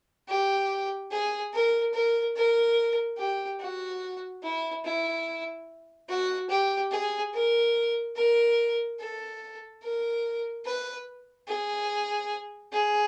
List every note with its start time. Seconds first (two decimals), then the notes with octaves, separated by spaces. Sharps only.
0.29 G4
1.11 G#4
1.53 A#4
1.93 A#4
2.36 A#4
3.18 G4
3.60 F#4
4.43 E4
4.85 E4
6.09 F#4
6.50 G4
6.91 G#4
7.34 A#4
8.16 A#4
8.99 A4
9.82 A#4
10.65 B4
11.48 G#4
12.73 G#4